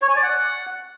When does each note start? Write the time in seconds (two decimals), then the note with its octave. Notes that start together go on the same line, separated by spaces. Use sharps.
0.02 C#5
0.09 G#5
0.16 D5
0.23 F#5